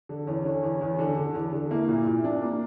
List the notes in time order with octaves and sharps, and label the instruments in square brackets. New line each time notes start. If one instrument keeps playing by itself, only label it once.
[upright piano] D3
[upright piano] E2 [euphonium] C#4
[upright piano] D3
E2
E2
D3
D3
E2
D3
[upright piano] A#3 [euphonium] E4
[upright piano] A#2
A#2
D4
A#3